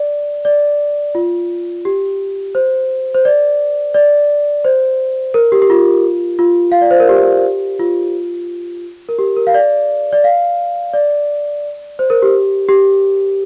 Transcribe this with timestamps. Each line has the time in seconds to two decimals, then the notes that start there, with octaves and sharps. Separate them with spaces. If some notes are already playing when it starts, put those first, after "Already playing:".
Already playing: D5
0.45 D5
1.15 F4
1.85 G4
2.55 C5
3.15 C5
3.25 D5
3.94 D5
4.64 C5
5.34 A#4
5.52 G4
5.62 G4
5.70 F4
6.39 F4
6.72 F5
6.81 D5
6.91 C5
7.00 A#4
7.09 G4
7.79 F4
9.09 A#4
9.19 G4
9.37 A#4
9.47 F5
9.54 D5
10.13 D5
10.24 F5
10.94 D5
11.99 C5
12.10 A#4
12.22 G4
12.69 G4